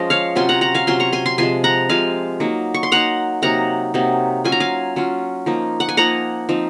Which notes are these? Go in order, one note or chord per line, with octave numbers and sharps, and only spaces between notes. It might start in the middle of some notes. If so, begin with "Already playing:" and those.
Already playing: F3 G#3 C#4 F4 D#5
C#5 F5
C3 F#3 C#4 F4 G#5 C6
F#5 A#5
F#5 A#5
F5 G#5
C3 F#3 C#4 F4 G#5 C6
A#5 C#6
G#5 C6
G#5 C6
C3 F3 G#3 G#5 C6
F#5 A#5
C3 F3 G#3 F5 G#5
F#3 A#3 D#4
C#6
C6
F#3 A#3 D#4 F#5 A#5
C3 F#3 A#3 D#4 F#5 A#5
C3 F#3 A#3 D#4
F#3 C#4 F4 G#5
A#5
F5 G#5
F#3 C#4 F4
F3 A#3 D#4
F#5
G#5
F3 A#3 D#4 F#5 A#5
F3 C4 D#4